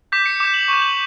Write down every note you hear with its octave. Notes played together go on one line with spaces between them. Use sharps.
D6 G6 B6
C#7
D6 G6 E7
F#7
C#6 G6
F#7